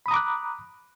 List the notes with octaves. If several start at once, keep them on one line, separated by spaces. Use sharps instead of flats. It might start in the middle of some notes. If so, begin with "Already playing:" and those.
A#5 B5 D6 D#6 F#6